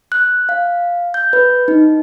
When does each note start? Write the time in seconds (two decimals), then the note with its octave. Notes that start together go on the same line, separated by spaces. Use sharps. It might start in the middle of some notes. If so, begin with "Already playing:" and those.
0.12 F#6
0.49 F5
1.14 G6
1.33 B4
1.68 D#4